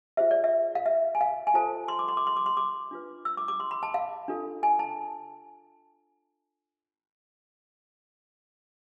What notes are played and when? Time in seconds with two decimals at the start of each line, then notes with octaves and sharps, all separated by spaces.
0.17 F4 G#4 C5 E5
0.31 D5
0.44 E5
0.75 F5
0.86 E5
1.15 G#5
1.21 F5
1.47 G#5
1.54 F4 A4 C5 A5
1.88 C6
1.99 D6
2.08 C6
2.17 D6
2.27 C6
2.37 D6
2.46 C6
2.57 D6
2.91 D4 F4 B4
3.25 E6
3.37 D6
3.48 D6
3.60 C6
3.71 B5
3.83 A5
3.94 F5
4.28 D4 F4 A4
4.63 G#5
4.79 A5